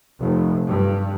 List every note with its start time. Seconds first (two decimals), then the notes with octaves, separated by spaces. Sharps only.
0.19 F1
0.68 G2